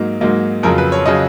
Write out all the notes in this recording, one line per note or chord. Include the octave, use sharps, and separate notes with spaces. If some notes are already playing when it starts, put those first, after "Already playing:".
Already playing: G#2 F#3 A#3 D#4
G#2 F#3 A#3 D#4
F2 C#3 F#3 A#4
B4
C#5
C#3 F#3 D#5